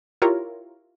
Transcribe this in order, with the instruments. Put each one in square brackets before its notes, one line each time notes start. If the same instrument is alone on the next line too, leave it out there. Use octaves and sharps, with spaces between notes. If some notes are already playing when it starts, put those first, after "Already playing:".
[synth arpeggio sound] E4 F4 G4 A#4 C#5